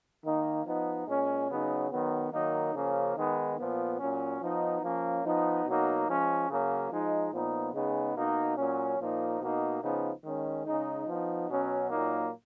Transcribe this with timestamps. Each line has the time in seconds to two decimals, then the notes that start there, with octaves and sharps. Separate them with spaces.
0.24 D#3 A#3 D#4
0.66 F3 B3 D#4
1.08 A#2 G#3 C#4
1.50 C#3 F#3 B3 D#4
1.91 D#3 F#3 B3
2.32 D#3 F#3 A#3 D#4
2.74 C#3 F3 A#3 C#4
3.16 D#3 G#3 B3 D#4
3.58 A#2 F3 B3
3.99 A#2 F#3 C#4
4.41 F3 B3 D#4
4.83 F3 A#3 C#4
5.24 F3 B3 D#4
5.65 B2 F#3 A#3 D#4
6.08 F3 G#3 C#4
6.49 C#3 F#3 A#3 C#4
6.91 F3 G#3 D#4
7.32 A#2 F3 B3 D#4
7.73 C#3 G#3 B3 D#4
8.15 B2 A#3 D#4
8.57 A#2 F#3 C#4
8.99 A#2 F3 A#3 D#4
9.41 B2 A#3 D#4
9.82 C#3 F3 B3 D#4
10.23 D#3 G#3 C#4
10.66 C#3 G#3 D#4
11.07 F3 B3 D#4
11.49 B2 F#3 C#4
11.90 A#2 F#3 A#3 D#4